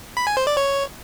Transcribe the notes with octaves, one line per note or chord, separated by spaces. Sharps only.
B5
G#5
C5
D5
C#5